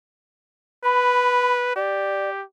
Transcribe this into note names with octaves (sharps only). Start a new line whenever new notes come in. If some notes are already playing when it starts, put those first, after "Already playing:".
B4 B5
G4 D5